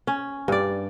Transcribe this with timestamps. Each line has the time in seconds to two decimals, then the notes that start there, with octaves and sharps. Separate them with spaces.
0.07 C#4
0.48 G2 D5